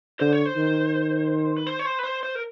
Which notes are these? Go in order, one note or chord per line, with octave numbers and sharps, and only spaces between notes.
D3 C5
C#5
C5
D#3
B4
C5
C#5
C5
B4
C5
C5
A#4